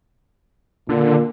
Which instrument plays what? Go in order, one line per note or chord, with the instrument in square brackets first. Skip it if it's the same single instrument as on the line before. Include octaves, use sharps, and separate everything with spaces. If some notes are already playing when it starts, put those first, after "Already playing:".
[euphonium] A#2 [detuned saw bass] D3